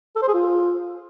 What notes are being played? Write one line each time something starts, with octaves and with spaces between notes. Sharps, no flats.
A4
C5
G#4
F4